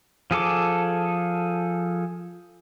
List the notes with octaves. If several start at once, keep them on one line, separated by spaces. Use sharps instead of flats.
F3 G#4 A4 D6